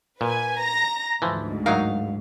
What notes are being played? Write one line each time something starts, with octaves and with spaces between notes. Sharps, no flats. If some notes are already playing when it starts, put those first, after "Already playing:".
A#2 B4 G#5
A#5 A#6
D2 G#2 E3 F3
F#3 D#4 A#4 F5